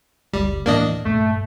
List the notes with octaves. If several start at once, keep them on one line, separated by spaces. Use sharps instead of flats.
F#1 C#2 G3
D#2 A2 E3 A#3 D4 D#5
D#1 G2 A3